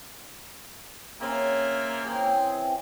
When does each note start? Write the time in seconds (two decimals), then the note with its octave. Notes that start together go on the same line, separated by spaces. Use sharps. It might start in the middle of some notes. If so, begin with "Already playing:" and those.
1.21 C#3 A#3 C4 F4 E5 G#5
2.05 E3 C4 G#4 C#5 G5